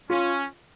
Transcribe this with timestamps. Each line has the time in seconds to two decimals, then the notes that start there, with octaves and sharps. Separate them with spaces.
0.10 C#4 F4